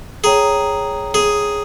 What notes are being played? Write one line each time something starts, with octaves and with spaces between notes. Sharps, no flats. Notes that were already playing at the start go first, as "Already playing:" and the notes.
G#4 C#5 G5 A#5
G#4